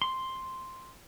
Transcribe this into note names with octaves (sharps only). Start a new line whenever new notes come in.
C6